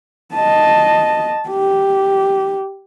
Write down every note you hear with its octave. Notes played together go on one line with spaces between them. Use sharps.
D#5 A5
G4